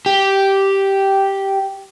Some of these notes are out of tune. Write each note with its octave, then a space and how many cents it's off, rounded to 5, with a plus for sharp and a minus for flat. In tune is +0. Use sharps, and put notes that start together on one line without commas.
G4 -5